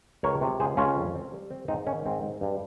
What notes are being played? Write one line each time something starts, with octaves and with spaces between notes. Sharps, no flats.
C#2 A#4 C#5
C3
C#2 G#4 C5
C#2 C#4 F4
F2
C4
G3
C4
G#2 C4 D#4
D#3 C#4
G#2 C4
G#2
G2